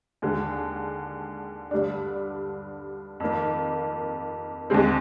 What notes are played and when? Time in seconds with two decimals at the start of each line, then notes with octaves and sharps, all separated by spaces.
0.22 D#2 D3 G#3
1.71 G2 D3 G3 D4
3.20 F2 D#3 A#3
4.70 D#2 D3 G#3 C4